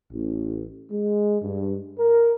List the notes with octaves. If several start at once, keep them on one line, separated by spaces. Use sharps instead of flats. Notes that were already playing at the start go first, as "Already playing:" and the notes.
A1
G#3
G2
A#4